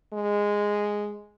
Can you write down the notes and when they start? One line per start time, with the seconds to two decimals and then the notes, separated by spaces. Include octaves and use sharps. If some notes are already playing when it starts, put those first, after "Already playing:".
0.13 G#3